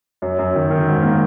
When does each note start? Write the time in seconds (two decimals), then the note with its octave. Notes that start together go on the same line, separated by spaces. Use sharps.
0.22 F#2
0.39 F#2
0.55 D#3
0.70 D#3
0.88 G#2
1.03 A#3